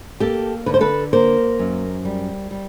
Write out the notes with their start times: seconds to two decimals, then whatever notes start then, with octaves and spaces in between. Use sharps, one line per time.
0.20 A#3 G4 A4
0.66 D3 B4
0.74 C5
0.81 A4 B4
1.13 A#3 A#4 C5
1.59 F#2
2.05 G3
2.51 G3